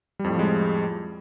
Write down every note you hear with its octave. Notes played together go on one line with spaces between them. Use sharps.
F2 A2 F3 G3 G#3